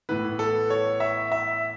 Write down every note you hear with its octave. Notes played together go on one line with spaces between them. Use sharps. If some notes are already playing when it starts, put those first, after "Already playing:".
A2 E3 B3 E4 B4
A4
C#5
E5
E5